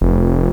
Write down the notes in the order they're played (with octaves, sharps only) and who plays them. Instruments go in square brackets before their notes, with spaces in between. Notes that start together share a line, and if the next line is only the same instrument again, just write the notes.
[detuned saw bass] F1